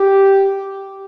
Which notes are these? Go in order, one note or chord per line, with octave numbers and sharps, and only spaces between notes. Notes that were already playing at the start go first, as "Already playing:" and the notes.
Already playing: G4